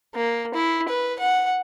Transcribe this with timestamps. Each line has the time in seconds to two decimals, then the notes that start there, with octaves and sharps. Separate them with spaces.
0.14 A#3
0.55 E4
0.89 B4
1.19 F#5